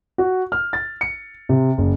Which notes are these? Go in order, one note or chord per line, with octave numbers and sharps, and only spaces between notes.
F#4
F6
A6
C#7
C3
F#1